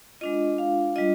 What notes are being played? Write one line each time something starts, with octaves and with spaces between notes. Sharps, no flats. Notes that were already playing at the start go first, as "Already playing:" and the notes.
G#3 D4 F4 D#5
F5
G3 D4 F4 D#5